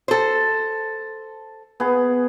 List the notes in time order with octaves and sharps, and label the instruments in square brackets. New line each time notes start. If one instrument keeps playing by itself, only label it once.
[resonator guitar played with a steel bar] A4 C5
[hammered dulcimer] B3 G#4